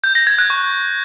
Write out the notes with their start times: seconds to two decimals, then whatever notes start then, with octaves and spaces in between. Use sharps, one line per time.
0.04 G6
0.15 A#6
0.27 G#6
0.38 F#6
0.50 C#6